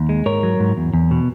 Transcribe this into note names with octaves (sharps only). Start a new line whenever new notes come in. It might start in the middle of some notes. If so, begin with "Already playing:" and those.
Already playing: D#2
G#3
G#2 A#4 C#5
F#3
G#2
E2
E2
B2